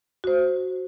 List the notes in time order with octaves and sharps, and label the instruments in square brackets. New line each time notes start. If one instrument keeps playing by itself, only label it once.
[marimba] F#4 C5